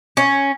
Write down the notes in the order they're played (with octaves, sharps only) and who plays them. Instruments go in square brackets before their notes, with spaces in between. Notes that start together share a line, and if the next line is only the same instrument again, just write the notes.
[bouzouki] C#4